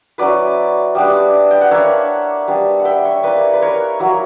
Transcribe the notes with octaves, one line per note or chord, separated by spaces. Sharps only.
F#3 C#4 E4 B4 D5
G3 B3 D4
G5
F#5
A#3 D4 C#5 E5
G3 B3 D4
F#5
E5 G5
C#5 E5
A#3 E4 B4 D5
B4
A#4 C#5
F#3 A#3 E4